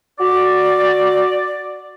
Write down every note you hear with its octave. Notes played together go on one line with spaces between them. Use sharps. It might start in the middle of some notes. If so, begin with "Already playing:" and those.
F#4 D5